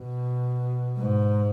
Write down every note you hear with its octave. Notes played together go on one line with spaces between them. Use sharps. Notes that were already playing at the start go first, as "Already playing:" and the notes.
Already playing: B2
G#2